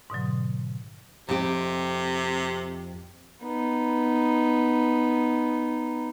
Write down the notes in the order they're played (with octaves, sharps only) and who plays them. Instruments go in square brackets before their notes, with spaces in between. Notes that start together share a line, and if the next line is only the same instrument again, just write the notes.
[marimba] G#2 B2 D3 F#3
[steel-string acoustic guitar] F2 G4 [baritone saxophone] C3
[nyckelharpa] B3 D#4